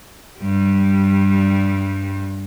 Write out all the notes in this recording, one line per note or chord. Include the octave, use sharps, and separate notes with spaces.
G2 G3